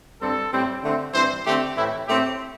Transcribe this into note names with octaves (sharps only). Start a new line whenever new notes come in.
G2 G3 C4 A4
A2 G3 C4
D3 A3 C4
G2 E3 C4 C5
D3 A3 C4 G4
A2 E3 A3 C4 E4
A2 A3 C4 G4